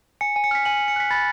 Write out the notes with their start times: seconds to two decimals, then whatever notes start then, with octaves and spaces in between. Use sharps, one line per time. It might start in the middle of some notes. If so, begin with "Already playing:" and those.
0.21 G#5 C#7
0.36 G#5
0.44 C#7
0.51 F6 B6
0.65 G#5 F#7
0.77 C#7
0.81 G#5
0.88 C#7
0.96 F#6 B6
1.11 B5 A6